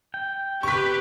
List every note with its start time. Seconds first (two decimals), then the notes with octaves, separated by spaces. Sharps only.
0.14 G5
0.63 G4 B4 C#6 B6